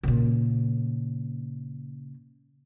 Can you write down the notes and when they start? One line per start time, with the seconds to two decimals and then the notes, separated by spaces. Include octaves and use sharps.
0.03 A#2 C#3